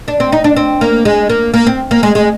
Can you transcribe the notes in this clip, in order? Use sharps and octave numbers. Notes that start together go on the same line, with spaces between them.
D4
C4
D#4
D4
C4
A#3
G#3
A#3
A#3
C4
A#3
G#3
G#3